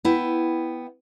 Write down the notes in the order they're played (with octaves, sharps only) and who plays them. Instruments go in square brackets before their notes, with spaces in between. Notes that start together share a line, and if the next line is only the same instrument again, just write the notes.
[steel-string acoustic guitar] B3 E4 G5